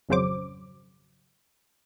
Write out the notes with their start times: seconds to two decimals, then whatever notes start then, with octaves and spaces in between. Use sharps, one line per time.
0.09 G#1 F2 C#3 F#3 C5 D6